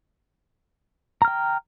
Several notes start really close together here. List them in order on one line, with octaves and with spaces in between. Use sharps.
A#5 F6 G5